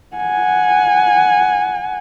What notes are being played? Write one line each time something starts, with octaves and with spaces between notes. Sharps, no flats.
F#5 G#5